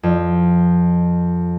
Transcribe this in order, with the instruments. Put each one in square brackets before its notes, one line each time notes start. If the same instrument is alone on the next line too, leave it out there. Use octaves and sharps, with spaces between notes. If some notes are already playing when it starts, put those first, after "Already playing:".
[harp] F2